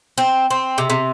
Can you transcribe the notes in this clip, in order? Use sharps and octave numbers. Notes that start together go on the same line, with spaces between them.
C4
C4
C3
C3